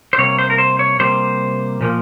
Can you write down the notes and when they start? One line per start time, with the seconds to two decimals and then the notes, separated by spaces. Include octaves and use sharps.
0.13 C5
0.18 C3 G3 A#3 C#5
0.38 C5
0.50 A#4
0.58 C5
0.79 C#5
1.00 C3 G3 A#3 C5
1.81 A#2 F3 A#3